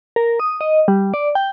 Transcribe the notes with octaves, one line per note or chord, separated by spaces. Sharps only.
A#4
D#6
D#5
G3
D5
G5